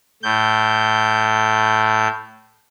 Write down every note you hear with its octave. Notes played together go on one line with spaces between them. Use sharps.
A2 G6